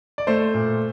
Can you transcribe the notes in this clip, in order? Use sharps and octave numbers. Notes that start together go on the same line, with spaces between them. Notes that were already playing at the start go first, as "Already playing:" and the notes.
D5
A3 A4 C5
A#2